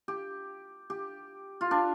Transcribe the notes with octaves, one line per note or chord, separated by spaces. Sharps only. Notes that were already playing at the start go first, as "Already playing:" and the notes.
G4
G4
F4
D4